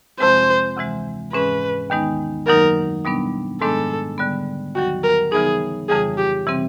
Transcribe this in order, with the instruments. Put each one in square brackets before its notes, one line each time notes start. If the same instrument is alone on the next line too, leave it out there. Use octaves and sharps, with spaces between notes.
[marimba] F2 C3 F3 G#3 C4 [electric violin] C5
[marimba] D2 C3 E3 G#3
[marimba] G#2 E3 G#3 C#4 [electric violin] B4
[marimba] D#2 D#3 G#3 B3 D#4
[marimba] F#2 D#3 F#3 A#3 D#4 [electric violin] A#4
[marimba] B2 G3 B3 D4
[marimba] G#2 D#3 G#3 B3 D4 [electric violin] A4
[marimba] D3 G3 B3
[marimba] D#2 D#3 F#3 [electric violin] F#4
[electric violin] A#4
[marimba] C#3 E3 G3 B3 D#4 [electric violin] G#4
[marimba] F2 C#3 E3 G3 [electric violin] G#4
[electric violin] G4
[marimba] C3 E3 G3 C4